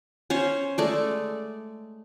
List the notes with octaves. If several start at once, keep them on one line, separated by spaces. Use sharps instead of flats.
C#4 C5 C#5
G#3 A3 D5